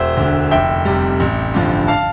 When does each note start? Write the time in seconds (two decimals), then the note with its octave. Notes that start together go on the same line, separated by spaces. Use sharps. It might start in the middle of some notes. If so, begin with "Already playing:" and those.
Already playing: E1 C5 E5
0.17 D2 D3
0.51 F1 E5 G5
0.85 F2 C3 G3
1.20 A1
1.54 G2 D3 F3
1.87 F5 A5